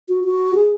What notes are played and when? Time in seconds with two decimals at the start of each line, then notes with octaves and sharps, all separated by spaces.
0.09 F#4
0.24 F#4
0.55 G#4